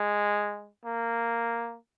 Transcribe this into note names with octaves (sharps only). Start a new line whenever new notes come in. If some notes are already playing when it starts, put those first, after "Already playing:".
Already playing: G#3
A#3